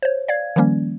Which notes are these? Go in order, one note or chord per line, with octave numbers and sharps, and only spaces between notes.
C5 C#5
D5 F5 G#6
D#3 F3 G3 A#3 C#4